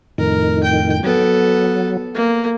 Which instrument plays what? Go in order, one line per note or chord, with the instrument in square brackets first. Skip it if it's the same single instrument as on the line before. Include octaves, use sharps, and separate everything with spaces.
[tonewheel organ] F2 A2 D#3 [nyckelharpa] A#4
[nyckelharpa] G5
[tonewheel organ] F#3 [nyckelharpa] B3 A4
[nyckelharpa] A#3